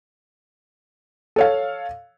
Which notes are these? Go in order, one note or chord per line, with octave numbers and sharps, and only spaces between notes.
A4 C#5 F5